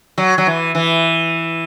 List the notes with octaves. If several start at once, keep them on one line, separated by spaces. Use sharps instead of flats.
F#3
F#3
E3
E3